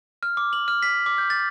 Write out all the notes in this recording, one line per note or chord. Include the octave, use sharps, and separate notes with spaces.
F6
D6
F#7
F6
B6
D6
G6
A6